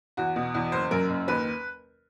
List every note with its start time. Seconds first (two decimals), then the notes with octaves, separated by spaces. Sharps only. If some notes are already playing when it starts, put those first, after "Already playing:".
0.17 E2 F#4
0.36 B2
0.54 E2
0.72 F#1 C5
0.91 F#2 A#4
1.09 F#1
1.28 D#2 B4